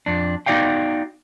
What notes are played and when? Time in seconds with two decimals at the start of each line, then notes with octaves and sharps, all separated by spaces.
0.06 F2 D4
0.46 B3 D#4 F#4 D5 F5 G5